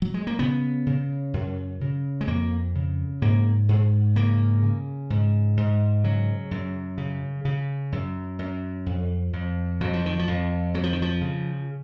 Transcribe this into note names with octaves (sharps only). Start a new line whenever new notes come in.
F#3
G#3
A#3
C#3 B3
C#3
F#2
C#3
G#3
F2 A#3
C#3
G#2 A#3
G#2
C#3 A#3
C#3
G#2
G#2
C#3 F#3
F#2
C#3
C#3
F#2
F#2
F2
F2
F2 F#3
F3
D#3
F3
F2
F2 F#3
F3
D#3
F3
C#3